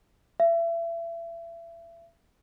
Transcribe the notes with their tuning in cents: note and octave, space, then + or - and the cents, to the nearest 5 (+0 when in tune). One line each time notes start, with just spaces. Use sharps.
E5 +30